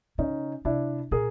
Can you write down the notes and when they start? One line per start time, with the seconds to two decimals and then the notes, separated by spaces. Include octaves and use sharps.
0.18 C#3 C#4 D#4
0.65 C3 D4 E4
1.11 A#2 G#4 A#4